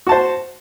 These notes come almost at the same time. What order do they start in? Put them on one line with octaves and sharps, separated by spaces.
F#4 A5 C5